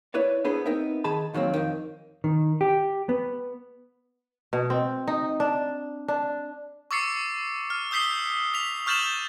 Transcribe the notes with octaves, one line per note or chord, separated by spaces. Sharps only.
E4 B4 C#5 D5
B3 D4 G#4 A4 C5 B5
B3 C4 D#4 A#4 E5
D#3 G#4 A5 B5
D#2 D#3 F#3 A#3 C4
F2 D#3
D#3
G4
B3
B2
C4
D#4
D4
D4
C#6 D6 E6 A6 C7 C#7
F6
D#6 E6 G6 B6 C7 G7
B6 F7
C#6 F6 G6 A6 E7 F#7